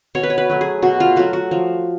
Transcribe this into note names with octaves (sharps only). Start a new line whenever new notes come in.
B2 C#5
B4
C#5
B4
F#3 A3
G#4
B2 F#4
F4
F#3 A3 F#4
F#4
F3